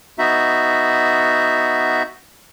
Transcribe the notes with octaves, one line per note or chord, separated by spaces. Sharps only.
B3 D#4 F#4 E5